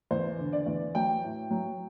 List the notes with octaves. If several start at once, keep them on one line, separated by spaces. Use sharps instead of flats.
E2 C5
D3
D5
E2
F#3 G5
A2
F#3